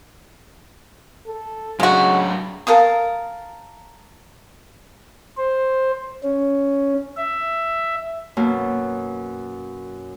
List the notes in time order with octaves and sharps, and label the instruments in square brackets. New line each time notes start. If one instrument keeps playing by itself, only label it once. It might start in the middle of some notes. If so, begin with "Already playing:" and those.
[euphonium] A4
[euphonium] C#3 [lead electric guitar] F#3 D4 [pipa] G#3 F#4
[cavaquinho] A4 A#4 F5 D#6
[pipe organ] C5
C#4
E5
[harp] F#2 B2 A#3